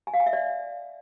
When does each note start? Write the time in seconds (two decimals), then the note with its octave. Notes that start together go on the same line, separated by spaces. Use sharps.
0.07 G#5
0.14 F5
0.20 G#5
0.26 E5
0.33 D5